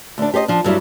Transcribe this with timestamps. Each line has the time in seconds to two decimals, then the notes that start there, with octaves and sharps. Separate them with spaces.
0.18 D2 D4
0.34 G4 C5 D5 D#5
0.48 F3 D4
0.64 G2 F#3 G3 E4